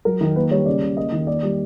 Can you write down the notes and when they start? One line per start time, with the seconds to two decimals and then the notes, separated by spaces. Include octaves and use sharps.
0.05 F#3 A#4
0.21 D#3
0.36 A#3 B4
0.51 G3 C#5
0.66 C#3 D5
0.82 C#3
0.97 A#3 D#5
1.12 D#3
1.27 A#3 D5
1.43 G3